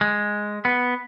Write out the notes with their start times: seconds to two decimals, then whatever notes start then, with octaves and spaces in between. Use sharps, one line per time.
0.01 G#3
0.65 B3